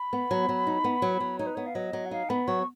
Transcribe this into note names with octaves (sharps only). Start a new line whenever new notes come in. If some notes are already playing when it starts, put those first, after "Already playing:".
Already playing: B5
B3
F#3
F#3
D#4
B3
F#3
F#3
D#4 C#5
B4
B3 C#5
F5
F#3 D#5
F#3
F#5
D#4 F5
B3 B5
F#3 C#6